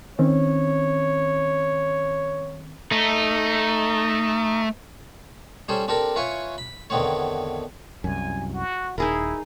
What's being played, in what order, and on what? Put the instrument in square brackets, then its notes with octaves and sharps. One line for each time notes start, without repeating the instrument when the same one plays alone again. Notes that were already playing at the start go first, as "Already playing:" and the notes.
[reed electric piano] D#3 C4 C#4 [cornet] C#5
[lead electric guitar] A3 [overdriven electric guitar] D#4
[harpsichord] G3 C#4 G#4 A4 C5
C4 D4 G4 A4 A#4
E4 F4 B4 C#5 G#5 C#6
B5
E2 D3 D#3 B3 C4 C#5
[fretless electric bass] C2 F#2 [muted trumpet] G#5
[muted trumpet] F#4
[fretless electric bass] D#1 [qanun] D#4 G#4 A#4 [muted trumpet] E4